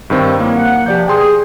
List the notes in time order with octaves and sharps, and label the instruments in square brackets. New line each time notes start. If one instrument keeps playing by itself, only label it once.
[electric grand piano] G2 D#3 C4
[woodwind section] F#3 E4 [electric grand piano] A#3
[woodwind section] F#5
[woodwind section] G2 C3 F3 [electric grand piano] G4 D5 G6
[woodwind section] G#4 [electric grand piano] G5 C6 D#6